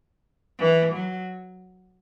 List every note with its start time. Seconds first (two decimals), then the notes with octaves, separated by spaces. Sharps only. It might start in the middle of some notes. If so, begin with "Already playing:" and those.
0.59 E3
0.93 F#3